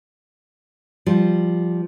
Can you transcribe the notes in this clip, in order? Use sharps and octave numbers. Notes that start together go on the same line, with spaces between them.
F3 G3